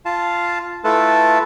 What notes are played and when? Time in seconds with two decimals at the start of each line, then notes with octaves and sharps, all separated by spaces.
0.05 F4 F5 A5
0.84 A3 E4 F4 A4 B4 A5